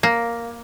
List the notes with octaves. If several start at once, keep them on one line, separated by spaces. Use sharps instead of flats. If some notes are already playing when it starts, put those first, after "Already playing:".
A#3